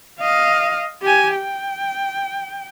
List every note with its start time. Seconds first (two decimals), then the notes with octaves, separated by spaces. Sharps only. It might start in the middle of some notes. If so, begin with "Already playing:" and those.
0.20 D#5 F5
1.02 G4 G#5
1.35 G5